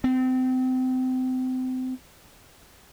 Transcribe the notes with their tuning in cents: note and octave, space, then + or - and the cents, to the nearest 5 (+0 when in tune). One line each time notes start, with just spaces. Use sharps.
C4 -30